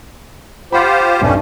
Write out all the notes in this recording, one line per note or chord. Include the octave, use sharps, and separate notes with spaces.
F4 G4 C5 F#5 B5
B1 G2 G3 A3 C#4